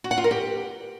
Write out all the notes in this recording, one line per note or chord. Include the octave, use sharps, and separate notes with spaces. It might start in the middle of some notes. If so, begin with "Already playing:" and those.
F#4
F#5
F4
A#4
G4